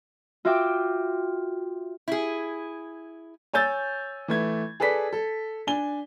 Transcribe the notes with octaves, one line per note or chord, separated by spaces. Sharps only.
F4 F#4 E5 G5 D6
E4 G#4
C#5 G#5 E6 G6 A6
E3 A3 G#6
G#4 A4 B4 D5 B6
A4
D4 G#5 G7